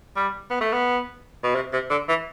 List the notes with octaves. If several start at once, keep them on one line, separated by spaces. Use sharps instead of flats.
G3
B3
A3
B3
B2
C3
C3
D3
E3